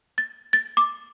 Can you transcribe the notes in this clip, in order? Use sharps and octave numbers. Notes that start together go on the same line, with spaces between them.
A6
A6
D6